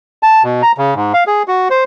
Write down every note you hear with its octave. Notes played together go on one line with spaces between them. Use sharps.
A5
B2
A#5
C#3
G#2
F5
G#4
F#4
C5